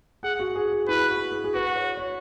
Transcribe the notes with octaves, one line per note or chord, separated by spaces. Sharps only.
G#4 F#5
F#4
G#4
G#4
E4 B4
F#4
G#4
G#4
F#4 B4
C#5
C#5